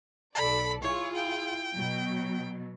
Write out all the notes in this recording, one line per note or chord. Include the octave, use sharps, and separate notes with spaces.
B1 A4 D5 B5
E4 F4 G#4 C#5
G5
B2 F#3